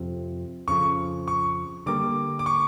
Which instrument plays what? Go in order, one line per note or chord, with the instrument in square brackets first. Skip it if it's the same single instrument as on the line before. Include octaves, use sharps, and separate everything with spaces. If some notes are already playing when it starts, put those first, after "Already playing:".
Already playing: [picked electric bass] F2 C3 F3
[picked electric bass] F2 C#3 F3 [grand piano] C#6
[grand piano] C#6
[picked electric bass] D3 G3 A#3 [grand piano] D6
[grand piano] D6
C#6